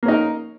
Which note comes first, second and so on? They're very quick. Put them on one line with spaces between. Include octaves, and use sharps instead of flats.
A#3 C#4 D#4 A#4